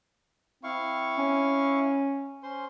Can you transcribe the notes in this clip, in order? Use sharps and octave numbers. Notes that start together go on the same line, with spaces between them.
C4 E4 F5 C#6
C#4
C#4 C5 C6